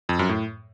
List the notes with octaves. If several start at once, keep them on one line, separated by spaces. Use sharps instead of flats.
F2
F#2
A2